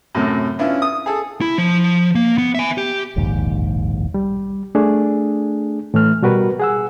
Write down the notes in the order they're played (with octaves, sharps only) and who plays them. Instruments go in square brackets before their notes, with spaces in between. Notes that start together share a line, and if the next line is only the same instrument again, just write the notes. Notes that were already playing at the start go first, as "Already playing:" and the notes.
[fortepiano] F#2 A2 C3
B3 C#4 D4 E4 F4
D#6
G#4 A4
[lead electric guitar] E4
F3
A#3
B3
E5 G#5
G4
[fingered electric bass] E1 A#1 D#2 G#2
[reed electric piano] G3
A3 D4 G#4
A2 E3 A3 F6
B2 G3 F#4 A#4 B4
G#4 F#5 E6